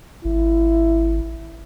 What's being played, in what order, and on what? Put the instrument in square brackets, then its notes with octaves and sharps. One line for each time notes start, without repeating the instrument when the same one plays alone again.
[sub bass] G#1 [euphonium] E4